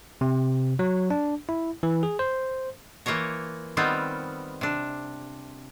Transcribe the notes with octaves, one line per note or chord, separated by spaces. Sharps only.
C3
F#3
D4
E4
E3
G#4
C5
E3 A#3 F4 C#5 A#5
D#3 G3 B3 C4 F4
C3 D4